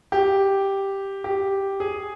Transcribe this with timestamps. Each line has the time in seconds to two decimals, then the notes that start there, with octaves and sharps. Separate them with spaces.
0.12 G4
1.24 G4
1.80 G#4